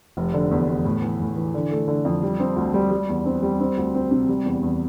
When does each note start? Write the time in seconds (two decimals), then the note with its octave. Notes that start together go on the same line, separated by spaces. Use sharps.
0.17 F1
0.34 D3
0.51 E2
0.69 E2
0.85 A2
1.02 E3
1.20 A2
1.36 E3
1.54 D3
1.72 A3
1.88 D3
2.05 F2
2.23 G3
2.40 C4
2.56 D2
2.74 G3
2.91 G3
3.09 E2
3.26 C4
3.43 G3
3.60 C4
3.77 D2
3.95 C4
4.11 C3
4.29 G3
4.45 E2
4.63 E2